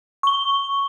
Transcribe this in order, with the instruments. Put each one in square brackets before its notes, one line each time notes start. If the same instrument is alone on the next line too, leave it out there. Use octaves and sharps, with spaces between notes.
[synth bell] C#6 G7